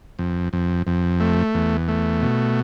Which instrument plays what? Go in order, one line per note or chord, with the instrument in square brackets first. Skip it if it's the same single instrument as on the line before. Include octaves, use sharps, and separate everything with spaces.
[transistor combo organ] F2
F2
F2
A3
E2
A3
B2